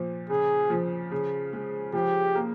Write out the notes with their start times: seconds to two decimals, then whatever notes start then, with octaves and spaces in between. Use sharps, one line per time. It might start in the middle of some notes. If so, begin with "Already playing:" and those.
Already playing: A#2 F3
0.29 C#3 G#4
0.70 F3
1.11 C#3
1.53 G#3
1.93 F3 G4
2.35 A#3